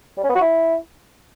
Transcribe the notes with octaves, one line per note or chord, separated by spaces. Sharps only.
G3
C#4
B3
F#4
E4